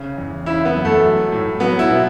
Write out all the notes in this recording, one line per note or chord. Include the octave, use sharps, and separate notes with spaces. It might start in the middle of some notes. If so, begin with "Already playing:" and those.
Already playing: C#3
E2
C#3 E4
B3
F#2
A3
F#3
A2
F#3 B3
E4
B2